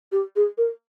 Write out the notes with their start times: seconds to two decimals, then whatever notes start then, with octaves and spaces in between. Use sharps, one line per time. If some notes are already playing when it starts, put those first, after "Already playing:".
0.12 G4
0.36 G#4
0.58 A#4